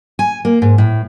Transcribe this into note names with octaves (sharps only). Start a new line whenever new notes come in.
G#5
A#3
G#2
A2